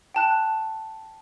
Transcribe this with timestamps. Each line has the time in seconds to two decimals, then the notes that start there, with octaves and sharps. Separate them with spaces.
0.15 G5 A5 F#6